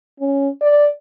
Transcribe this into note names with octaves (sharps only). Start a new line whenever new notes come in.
C#4
D5